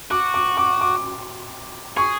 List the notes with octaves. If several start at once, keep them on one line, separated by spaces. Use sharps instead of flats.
F#4 D6
D6
D6
D6
G#4 C#6